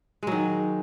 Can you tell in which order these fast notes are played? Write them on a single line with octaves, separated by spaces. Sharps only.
G#3 F#3 D#3